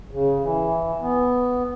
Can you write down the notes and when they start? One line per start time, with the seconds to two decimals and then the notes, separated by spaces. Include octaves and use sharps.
0.11 C#3
0.42 E3
1.01 B3